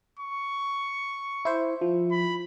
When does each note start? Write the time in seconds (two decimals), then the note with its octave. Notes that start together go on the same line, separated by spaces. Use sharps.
0.19 C#6
1.45 E4 C5
1.81 F3
2.11 B5